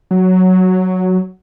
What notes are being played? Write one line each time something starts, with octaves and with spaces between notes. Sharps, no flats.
F#3